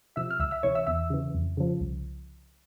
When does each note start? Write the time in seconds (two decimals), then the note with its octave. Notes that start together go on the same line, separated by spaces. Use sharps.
0.16 C3 F3 E5 E6
0.30 F6
0.40 C#2 E5 E6
0.51 E5 E6
0.63 C3 E3 C#5 C#6
0.75 E5 E6
0.87 E2 E5 E6
1.10 C#3 E3
1.34 F2
1.57 C#3 F3
1.81 C2